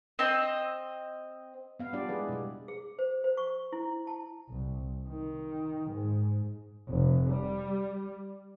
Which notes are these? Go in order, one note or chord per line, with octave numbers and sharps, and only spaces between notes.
C4 D#5
B3 F5
G3 D4 F4 G4 D5
G#3 E4 G#4 B4
B2 G3
G#4
C5
C5
C#6
E4
A5
C2
D#3
G#2
F1
G3